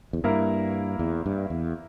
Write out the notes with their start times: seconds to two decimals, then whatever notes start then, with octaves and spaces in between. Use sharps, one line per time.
0.13 E2
0.24 G2 A#3 E4 A#4
0.99 E2
1.26 G2
1.50 E2